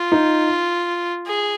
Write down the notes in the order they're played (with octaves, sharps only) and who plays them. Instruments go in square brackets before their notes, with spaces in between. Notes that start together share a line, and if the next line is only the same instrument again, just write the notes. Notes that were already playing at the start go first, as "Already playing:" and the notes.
Already playing: [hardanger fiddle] F4
[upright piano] D#4
[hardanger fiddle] G#4